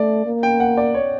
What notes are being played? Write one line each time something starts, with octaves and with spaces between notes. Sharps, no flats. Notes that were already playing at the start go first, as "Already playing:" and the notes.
Already playing: A3 D5
A#3
G5
F#5
D5
C#5